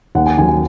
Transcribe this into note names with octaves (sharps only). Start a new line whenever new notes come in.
D#2 F#5
G#5
D#3 F#3 G#5
G#5